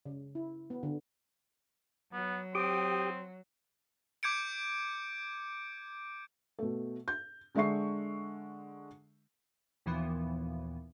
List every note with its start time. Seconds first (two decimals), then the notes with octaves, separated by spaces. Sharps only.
0.06 C#3
0.35 E4
0.70 B3
0.83 D3
2.13 F#3 B3
2.55 C4 G4 G5 D#6
4.23 D6 G6 G#6 C#7 D7
6.59 B2 A3
7.08 G6
7.55 D3 G#3 D4 E5 C#6 C7
9.86 D#2 A#2 E3 F3 B3